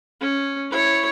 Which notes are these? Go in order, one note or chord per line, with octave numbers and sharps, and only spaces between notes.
C#4
E4 C#5